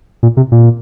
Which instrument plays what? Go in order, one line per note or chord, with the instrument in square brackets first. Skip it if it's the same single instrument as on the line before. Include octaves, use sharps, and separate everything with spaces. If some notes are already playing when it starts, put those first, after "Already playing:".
[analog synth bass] A#2
C3
A#2